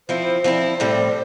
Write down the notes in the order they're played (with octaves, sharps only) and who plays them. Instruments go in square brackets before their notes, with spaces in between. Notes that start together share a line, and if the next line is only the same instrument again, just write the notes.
[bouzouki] F3 C4 E4 [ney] C5
[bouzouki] F3 C4 E4
A2 G3 C4